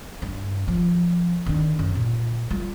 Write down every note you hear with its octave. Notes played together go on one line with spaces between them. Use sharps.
G2
F3
D#3 D4
F#2
A#2
G3 F4